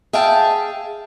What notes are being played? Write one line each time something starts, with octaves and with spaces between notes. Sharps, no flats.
G#4 E5 F5 G5 A5